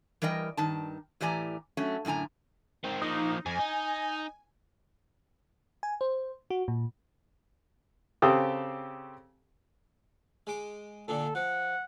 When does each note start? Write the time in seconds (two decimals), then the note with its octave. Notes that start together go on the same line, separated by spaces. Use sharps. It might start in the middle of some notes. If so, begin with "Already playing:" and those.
0.22 E3 G3 A#4 D#5 G5
0.57 G2 D#3 A5
1.21 A2 E3 G4 D5 G#5 A#5
1.77 F#3 A3 C#4
2.05 F#2 A2 D3 G#5 A#5
2.84 D#3 C4
3.02 F3 A#3 D#4
3.46 F2 G#5
3.59 D#4
5.83 G#5
6.01 C5
6.50 F#4
6.68 A#2
8.22 C#3 C4 G4 A4 D#6
10.47 G#3 D6
11.08 A#2 D3 A4
11.35 F3 F#5